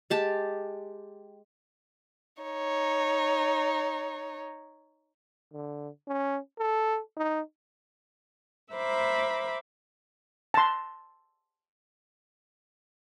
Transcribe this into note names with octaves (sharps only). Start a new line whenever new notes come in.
G#3 G4 A5
D#4 C#5
D3
C#4
A4
D#4
A#4 C5 E5 B5 D6
A5 C6